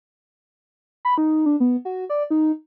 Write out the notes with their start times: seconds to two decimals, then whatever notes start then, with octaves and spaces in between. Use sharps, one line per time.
1.05 B5
1.18 D#4
1.46 D4
1.60 B3
1.85 F#4
2.10 D5
2.30 D#4